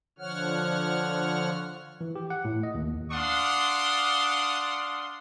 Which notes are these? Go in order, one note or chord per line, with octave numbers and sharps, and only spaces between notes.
D3 F3 C#5 F#5 F6
E3
G4
F#5
A2
D#5
D#2
D4 F5 F#5 C6 D6 D#6